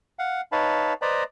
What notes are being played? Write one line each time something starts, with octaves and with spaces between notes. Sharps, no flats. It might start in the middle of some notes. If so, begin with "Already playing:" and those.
F5 F#5
D#4 B4 C#5 F5 A5 B5
B4 C5 D5 D#5 A#5 B5